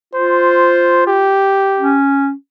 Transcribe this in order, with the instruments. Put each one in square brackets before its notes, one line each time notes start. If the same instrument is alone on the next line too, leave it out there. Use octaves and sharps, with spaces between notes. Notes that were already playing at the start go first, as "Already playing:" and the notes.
[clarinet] F4 [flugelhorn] C5
[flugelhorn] G4
[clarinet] C#4